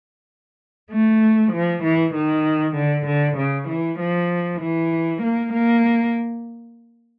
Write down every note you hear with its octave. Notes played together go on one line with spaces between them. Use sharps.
A3
F3
E3
D#3
D3
D3
C#3
E3
F3
E3
A#3
A#3